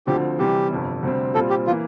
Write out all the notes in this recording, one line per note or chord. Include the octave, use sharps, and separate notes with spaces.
D2 D3 F3 C4 G4
C3 E3 G3 G4
G1 F2 C3
D2 C3 G3 C4
A#2 G3 C4 F4 A4
G4
E3 A#3 F4